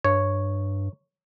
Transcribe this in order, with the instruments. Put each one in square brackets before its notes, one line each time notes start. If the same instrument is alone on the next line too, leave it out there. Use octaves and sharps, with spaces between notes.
[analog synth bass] G2 [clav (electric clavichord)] C#5